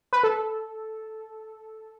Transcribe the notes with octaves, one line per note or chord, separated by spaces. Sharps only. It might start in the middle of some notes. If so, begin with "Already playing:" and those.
B4
A4